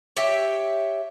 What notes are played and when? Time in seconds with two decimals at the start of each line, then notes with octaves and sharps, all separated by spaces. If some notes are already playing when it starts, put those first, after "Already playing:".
0.17 G4 C#5 E5 G5